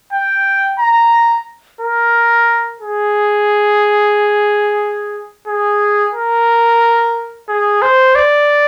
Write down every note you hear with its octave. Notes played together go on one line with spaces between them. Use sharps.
G5
A#5
A#4
G#4
G#4
A#4
G#4
C5
D5